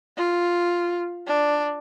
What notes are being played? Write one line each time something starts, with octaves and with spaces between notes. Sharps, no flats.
F4
D4